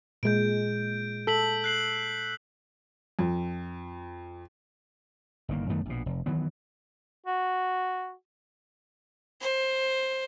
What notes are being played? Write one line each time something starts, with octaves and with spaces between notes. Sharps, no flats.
A#2 G#3 G6 D7
A4 E6 B6 F#7
F#6 C7 F#7
F2
G1 D#3 A#3
F#2 D#3 A3 B3
A#1 B2
F1
D#3 E3 F#3 B3
F#4
C5